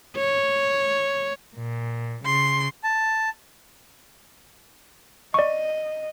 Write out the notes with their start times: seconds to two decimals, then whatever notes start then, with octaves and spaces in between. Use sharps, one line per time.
0.17 C#5
1.57 A#2
2.26 C#3 C6
2.84 A5
5.34 D5 D#5 C#6